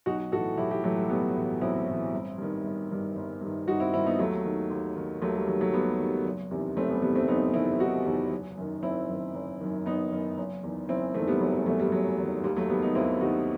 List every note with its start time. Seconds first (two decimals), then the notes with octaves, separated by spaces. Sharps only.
0.06 B1 D#4 F#4
0.32 A2 F#4 A4
0.36 E3
0.58 B1 E4 G4
0.71 E4 G4
0.84 E3 F#3 A3
0.87 A2
0.97 G3
1.10 B1 G3 B3
1.35 A2 E3
1.61 B1 C4 E4
1.87 A2 E3
2.13 G1
2.38 G2 D#3
2.64 G1
2.91 G2 D#3
3.16 G1
3.41 G2 D#3
3.67 G1 D#4 F#4
3.80 C4 E4
3.93 D#3 C4 E4
3.97 G2
4.06 B3 D#4
4.19 D#2 F#3 A3
4.45 D#3
4.70 D#2
4.96 D#3
5.22 D#2 F#3 A3
5.35 G3
5.48 D#3 F#3
5.61 F#3 A3
5.73 D#2 G3 B3
6.00 D#3
6.25 F#1
6.51 E2 C3 D#3
6.77 F#1 A3 C4
6.90 G3 B3
7.02 E2 C3 D#3 G3 B3
7.15 A3 C4
7.28 F#1 B3 D#4
7.54 E2 C3 D#3 C4 E4
7.80 F#1 D#4 F#4
8.05 E2 C3 D#3
8.32 F#1
8.57 F#2 D#3
8.82 F#1 C4 E4
9.09 F#2 D#3
9.35 F#1
9.61 F#2 D#3
9.86 F#1 B3 D#4
10.12 F#2 D#3
10.37 F#1
10.63 E2 D#3
10.89 F#1 C4 E4
11.14 E2 D#3 A3 C4
11.27 G3 B3
11.40 F#1 F#3 A3
11.54 G3
11.66 E2 D#3 F#3 A3
11.79 G3
11.92 F#1 F#3
12.18 E2 D#3
12.44 D#2 G3
12.57 F#3 A3
12.69 D#3 G3 B3
12.82 B3 D#4
12.95 D#2 C4 E4
13.21 D#3 D#4 F#4